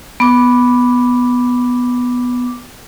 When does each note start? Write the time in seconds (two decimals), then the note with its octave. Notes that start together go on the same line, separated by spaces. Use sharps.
0.20 B3 D6